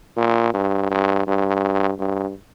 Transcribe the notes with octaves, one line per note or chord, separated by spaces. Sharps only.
A#2
G2
G2
G2
G2